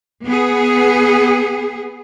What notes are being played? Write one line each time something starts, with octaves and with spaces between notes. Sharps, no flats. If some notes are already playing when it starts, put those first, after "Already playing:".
B3 G#4